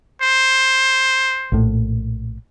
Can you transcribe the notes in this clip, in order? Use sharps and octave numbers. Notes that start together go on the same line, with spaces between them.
C5
A#1 A2